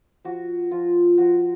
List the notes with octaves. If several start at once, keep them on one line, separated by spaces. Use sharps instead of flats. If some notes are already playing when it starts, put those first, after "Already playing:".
F3 F#4
F3 F4
F3 F#4